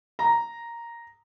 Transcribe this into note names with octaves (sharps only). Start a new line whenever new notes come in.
A#5